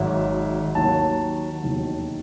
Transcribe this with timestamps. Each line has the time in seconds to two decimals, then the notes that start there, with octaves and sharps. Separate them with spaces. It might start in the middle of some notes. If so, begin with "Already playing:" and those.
Already playing: G#1 G#2 F#3 E5
0.75 D#2 D#3 F#3 A5
1.63 E1 D#2 D#3 F#3